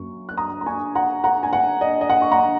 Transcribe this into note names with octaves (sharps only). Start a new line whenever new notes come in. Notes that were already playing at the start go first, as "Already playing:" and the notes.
Already playing: F#2 F#3 A#3 C#6
F#6
A#5 D#6
A#5
G#5 C#6
F#5 A#5
F#5 A#5
G#5
F#5
D#5
D#5
F#5
C#6
F#5 A#5